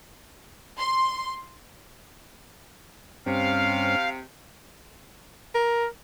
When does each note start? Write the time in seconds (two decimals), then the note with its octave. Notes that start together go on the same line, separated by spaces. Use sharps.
0.78 C6
3.26 G2 C3 C4 C#4 F5
5.55 A#4